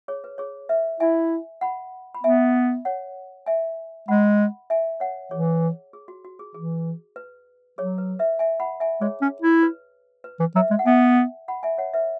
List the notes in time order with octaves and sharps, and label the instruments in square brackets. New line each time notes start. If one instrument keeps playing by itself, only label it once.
[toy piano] G#4 C#5
B4
G#4 C#5
B4 E5
[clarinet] E4 [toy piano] E5 G#5
[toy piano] F#5 B5
B5
[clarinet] B3 [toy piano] E5 G#5
[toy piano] C#5 F#5
E5 G#5
[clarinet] G#3 [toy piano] F#5 B5
[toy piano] E5 G#5
C#5 F#5
[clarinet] E3 [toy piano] G#4 C#5
[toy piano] G#4
F#4
F#4
G#4
[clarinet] E3 [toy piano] G#4
[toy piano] B4
[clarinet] F#3 [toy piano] G#4 C#5
[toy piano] B4
B4 E5
E5 G#5
F#5 B5
E5 G#5
[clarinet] G#3 [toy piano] G#4 C#5
[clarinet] C#4
E4
[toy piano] B4
B4
[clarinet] E3
[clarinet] F#3 [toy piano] B4 E5
[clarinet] G#3
[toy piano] F#5
[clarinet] B3 [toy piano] E5 G#5
[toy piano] F#5 B5
E5 G#5
C#5 F#5
B4 E5